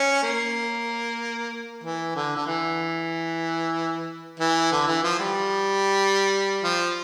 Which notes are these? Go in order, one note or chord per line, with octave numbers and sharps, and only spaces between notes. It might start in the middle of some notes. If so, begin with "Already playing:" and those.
Already playing: C#4
A#3
E3
D3
D3
E3
E3
D3
E3
F3
G3
F3